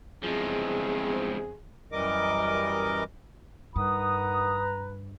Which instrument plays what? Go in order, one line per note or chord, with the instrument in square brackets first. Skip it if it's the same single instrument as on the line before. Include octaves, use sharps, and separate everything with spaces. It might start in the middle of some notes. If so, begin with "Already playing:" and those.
[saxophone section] E2 G2 C4 [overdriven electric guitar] F3 G#3 [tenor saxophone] G#4
[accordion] F#2 E3 G3 A#4 D#5 D6
[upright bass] G2 [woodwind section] D#3 F#5 D#6 [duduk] B4 [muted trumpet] A#5